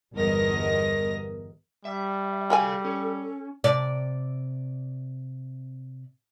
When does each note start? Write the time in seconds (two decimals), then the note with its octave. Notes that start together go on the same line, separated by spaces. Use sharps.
0.15 G1 E2 G2 A#4 D#5 A#6
1.85 G3 E5
2.50 F#4 G#4 A4 F5 G5 G#5
2.85 C#4
3.64 C3 D5